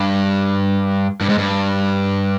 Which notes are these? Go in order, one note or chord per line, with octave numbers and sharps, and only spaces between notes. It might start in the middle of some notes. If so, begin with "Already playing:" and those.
Already playing: G2
G2
G#2
G2